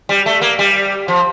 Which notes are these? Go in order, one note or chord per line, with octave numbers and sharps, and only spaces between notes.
G3
A3
A#3
G3
F3